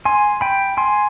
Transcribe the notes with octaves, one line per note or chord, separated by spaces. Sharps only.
G#5 C6
G5 B5
G#5 C6